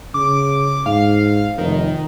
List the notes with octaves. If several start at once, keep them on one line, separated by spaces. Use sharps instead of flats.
C#3 D6
G#2 F5
F1 D#3